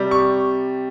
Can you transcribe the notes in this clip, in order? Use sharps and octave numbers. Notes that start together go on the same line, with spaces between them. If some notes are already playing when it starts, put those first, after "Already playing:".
Already playing: C3 G3
C#6